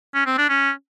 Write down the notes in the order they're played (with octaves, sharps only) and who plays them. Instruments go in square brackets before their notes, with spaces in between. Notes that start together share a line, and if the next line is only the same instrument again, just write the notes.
[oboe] C#4
C4
D4
C#4